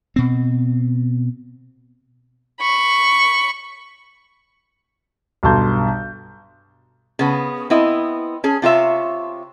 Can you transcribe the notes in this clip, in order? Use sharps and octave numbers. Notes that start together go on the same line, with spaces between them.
B2 C4
B5 C#6
B1 G2 A4 A5 C6 G6
C#3 B3
B3 C4 E4 D#5
C#4 G#4
C3 F4 C#5 E5